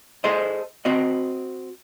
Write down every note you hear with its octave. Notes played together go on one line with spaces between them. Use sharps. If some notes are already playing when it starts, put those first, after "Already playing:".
G#4 A4 C5 D#5
C4 F#4 D#5